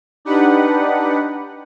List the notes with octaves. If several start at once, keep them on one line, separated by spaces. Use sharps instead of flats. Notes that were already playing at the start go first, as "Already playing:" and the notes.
D4 D#4 G4 B4 F#5